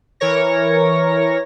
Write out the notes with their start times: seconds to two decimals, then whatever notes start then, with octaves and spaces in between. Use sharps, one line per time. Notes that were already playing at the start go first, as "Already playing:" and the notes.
0.20 E3 A#4 C#5 A#6